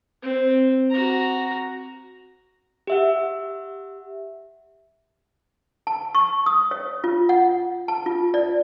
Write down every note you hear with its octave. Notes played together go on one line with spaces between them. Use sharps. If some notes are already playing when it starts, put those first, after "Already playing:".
C4
F#4 A#5
G4 E5 F#5
A5
C#6
D#6
C#5
F4
F#5
A5
F4
D5